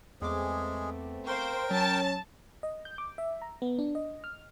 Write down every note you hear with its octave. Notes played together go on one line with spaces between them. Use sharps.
E2 G#3 A3 B3 C4 G#4 D6
A#4 C5 F5 G5 C6 C#6
F#3 C#4 A5
D#5
G6
D6
E5
A#5
B3
D4
D#5
F6